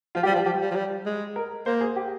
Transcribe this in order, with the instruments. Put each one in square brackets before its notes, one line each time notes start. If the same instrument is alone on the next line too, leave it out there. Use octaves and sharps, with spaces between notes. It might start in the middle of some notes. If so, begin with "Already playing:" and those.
[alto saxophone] F3 [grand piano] F4
[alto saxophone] G3 [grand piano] G4
[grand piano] F4
[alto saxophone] F3
[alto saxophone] F3 [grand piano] G4
[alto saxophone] G3
F3
G3
G#3
[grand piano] A#4
[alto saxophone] A#3 [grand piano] C5
[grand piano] G#4
G4